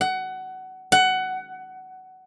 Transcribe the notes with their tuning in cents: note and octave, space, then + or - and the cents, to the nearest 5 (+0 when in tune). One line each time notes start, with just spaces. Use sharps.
F#5 +20
F#5 +15